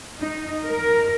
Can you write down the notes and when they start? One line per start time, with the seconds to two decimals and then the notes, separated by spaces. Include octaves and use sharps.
0.20 D#4
0.67 A#4